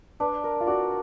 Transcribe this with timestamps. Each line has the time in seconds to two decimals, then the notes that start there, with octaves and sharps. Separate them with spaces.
0.20 D4 B4
0.44 A#4
0.61 F4
0.67 F#4 D5